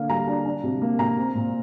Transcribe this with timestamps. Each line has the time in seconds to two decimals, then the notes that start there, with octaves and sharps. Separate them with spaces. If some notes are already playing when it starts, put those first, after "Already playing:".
Already playing: D3 A#3 F5
0.09 G3 A#5
0.27 D4
0.45 D4
0.64 C3
0.82 A#3
0.99 C3 A#5
1.17 C4
1.35 A#2